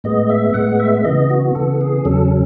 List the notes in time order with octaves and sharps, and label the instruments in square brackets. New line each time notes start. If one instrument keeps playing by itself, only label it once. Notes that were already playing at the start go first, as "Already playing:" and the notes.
[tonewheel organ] A2 G#3 B3 D#5
E5
A2 G#3 B3 F#5
E5
C#3 E3 B3 D#5
F#4
C#3 E3 B3 A4
G#4
E2 C#3 F#3 C#4 A4